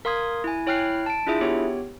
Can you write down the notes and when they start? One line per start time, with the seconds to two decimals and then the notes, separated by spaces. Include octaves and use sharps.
0.05 A#4 F5 C6 D#6 G#6
0.44 E4 G#5
0.66 E4 C#5 G5 F6 F#6 C7
1.06 A5 D7
1.27 D4 E4 F4 G#4 E5
1.41 B3 G4 C#5